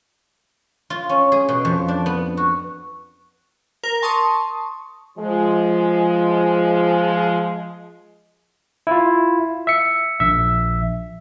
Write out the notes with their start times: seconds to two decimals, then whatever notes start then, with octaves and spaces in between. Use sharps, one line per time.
0.90 F4
1.09 C#4
1.32 G#4
1.49 B2
1.65 F2
1.88 D4
2.06 B3
2.37 F#4
3.83 A#4
4.02 A5 C6 C#6 D#6
5.18 F3 G#3
8.87 E4 F4
9.67 E5 C#7
10.20 A#1 E5